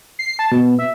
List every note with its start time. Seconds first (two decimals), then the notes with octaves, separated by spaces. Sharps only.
0.19 C7
0.39 A5
0.52 B2
0.79 E5